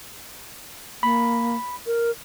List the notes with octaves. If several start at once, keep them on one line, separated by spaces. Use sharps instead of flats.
A#3 B5
A#4